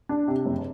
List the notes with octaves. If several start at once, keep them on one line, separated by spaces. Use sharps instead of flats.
D4
C3
F#1